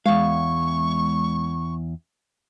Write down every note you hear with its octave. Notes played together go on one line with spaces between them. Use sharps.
E2 G#3 F5 C#6